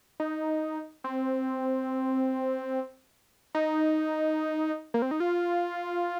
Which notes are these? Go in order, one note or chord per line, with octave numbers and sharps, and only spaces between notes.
D#4
C4
D#4
A#3
C4
D#4
F4